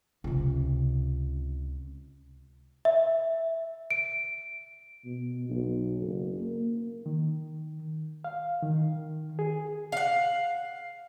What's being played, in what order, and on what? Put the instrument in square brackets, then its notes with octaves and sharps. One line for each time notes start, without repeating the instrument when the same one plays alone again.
[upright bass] C#2 C3
[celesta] E5
D7
[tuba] B2
B1
F#1
A#3
[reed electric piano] D#3
F5
D#3
G#4
[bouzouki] F5 F#5